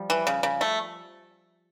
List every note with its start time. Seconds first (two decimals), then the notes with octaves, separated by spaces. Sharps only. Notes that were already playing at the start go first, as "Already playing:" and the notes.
Already playing: F3 G3
0.10 E3
0.27 C#3
0.43 C#3
0.61 A3